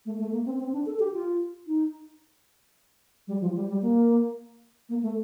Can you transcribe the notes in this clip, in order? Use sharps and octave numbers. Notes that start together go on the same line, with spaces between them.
A3
A3
A#3
C4
C4
D4
A4
G4
F4
D#4
G3
F3
G3
G3
A#3
A#3
A3